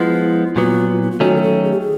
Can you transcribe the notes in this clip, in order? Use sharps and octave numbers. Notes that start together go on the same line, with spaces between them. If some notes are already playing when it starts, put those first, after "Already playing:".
Already playing: F3 G#3 B3 E4
A#2 F#3 B3 F4
E4
F4
D#3 F#3 A3 C#4 F#4
A#4
A4
G#4
G4
G#4